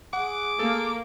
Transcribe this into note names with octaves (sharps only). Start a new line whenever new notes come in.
G#4 F#5 D6
A#3 A4